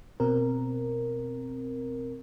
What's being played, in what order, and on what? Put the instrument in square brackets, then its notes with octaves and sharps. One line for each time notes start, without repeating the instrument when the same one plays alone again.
[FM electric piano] B2 C4 A#4